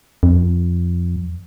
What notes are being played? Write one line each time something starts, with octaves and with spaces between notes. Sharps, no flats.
F2